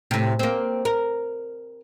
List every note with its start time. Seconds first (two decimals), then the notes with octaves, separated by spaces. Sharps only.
0.11 A2 C3
0.39 A#3 C4
0.85 A#4